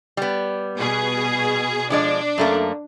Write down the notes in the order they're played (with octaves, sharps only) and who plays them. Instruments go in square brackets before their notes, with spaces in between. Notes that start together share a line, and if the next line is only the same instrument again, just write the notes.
[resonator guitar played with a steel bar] G3 B3
[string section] B2 G#4
[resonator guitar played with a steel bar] F3 G#3 D5 [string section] D4
[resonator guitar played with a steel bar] F#2 A3 A#3